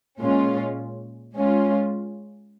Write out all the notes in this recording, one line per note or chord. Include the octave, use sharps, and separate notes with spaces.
A#2 G#3 C#4 F4
G#3 C#4 F4